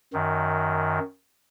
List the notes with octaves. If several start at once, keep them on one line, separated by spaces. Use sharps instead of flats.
F#2 D#3